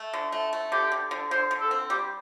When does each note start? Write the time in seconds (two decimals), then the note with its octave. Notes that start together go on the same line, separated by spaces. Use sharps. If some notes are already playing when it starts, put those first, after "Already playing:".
Already playing: A3
0.13 D3
0.32 A3
0.53 A3
0.72 D3 G4
0.92 D3
1.11 D3
1.31 D3 C5
1.51 D3
1.61 A4
1.71 C4
1.90 G3 G4